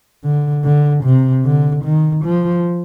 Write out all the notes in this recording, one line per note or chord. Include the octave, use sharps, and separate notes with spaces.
D3
D3
C3
D3
D#3
F3